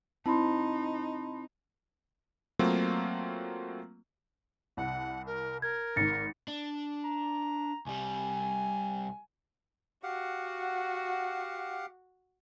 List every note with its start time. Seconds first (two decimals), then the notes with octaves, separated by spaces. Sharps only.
0.26 C4 D#4 E4 A5 B5 C6
2.59 F#3 A3 A#3 C4 F4
4.77 C2 F#5
5.27 A#4
5.62 A#4 G#6
5.96 G#1 G#2 A6 A#6 C#7
6.48 D4
7.04 A#5
7.86 C2 G3 G#5
10.03 F#4 G4 F5 F#5